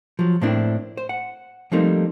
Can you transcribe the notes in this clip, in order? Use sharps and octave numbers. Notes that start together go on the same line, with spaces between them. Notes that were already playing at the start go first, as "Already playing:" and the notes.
F3 F#3
A2 A#3 C4 D4 E4
C5
F#5
F3 G3 A3 A#3 C4 D#4